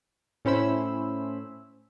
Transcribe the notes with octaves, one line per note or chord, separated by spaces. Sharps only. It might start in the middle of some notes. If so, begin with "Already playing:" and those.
A2 C#4 E4 C5 B5 E6